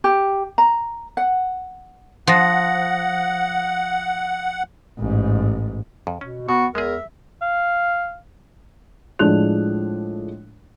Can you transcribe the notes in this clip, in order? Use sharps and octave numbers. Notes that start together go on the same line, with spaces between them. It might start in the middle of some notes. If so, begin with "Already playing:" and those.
G4
A#5
F#5
F3 F5 F#5 D#6 A#6
A1 G#2
F2
B2 C#4
B2 B3 F#4 C#6
E2 G#3 G#4 A#4 E5
F5
A2 F3 G#3 D4 F#6 F7